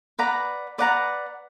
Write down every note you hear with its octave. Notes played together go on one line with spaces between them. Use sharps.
B4 D5 F#5 A#5
B4 D5 F#5 A#5